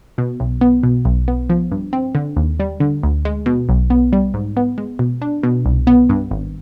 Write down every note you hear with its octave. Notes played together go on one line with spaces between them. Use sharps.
B2
B1
B3
B2
B1
B3
F3
G2
C4
D3
D#2
G3
D3
D2
G#3
B2
B1
B3
G3
G#2
B3
G#3
B2
D4
B2
C2
B3
G2
G#1